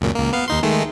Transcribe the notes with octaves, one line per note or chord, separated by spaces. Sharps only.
C#2 F#2 A#2
C#2 A#3
B3 F5
D#2 D#4 C6
D#3 G#3 A3